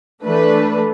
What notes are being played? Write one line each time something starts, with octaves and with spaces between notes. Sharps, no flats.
E3 A3 D4 B4